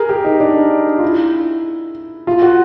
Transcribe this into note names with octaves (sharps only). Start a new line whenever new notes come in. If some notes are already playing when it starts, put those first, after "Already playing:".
Already playing: G#4 A#4
G4
D#4
D4
F4
E4
F4
F#4